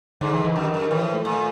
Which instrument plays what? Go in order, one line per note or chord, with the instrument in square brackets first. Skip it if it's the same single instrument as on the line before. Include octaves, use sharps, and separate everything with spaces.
[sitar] G#2 [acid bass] D3
[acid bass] E3
E3
[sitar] F#2 [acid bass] D#3
[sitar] F#2
[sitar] A2 [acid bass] E3
[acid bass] F3
A3
[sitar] A#2